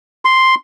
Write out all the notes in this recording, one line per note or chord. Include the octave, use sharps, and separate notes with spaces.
C6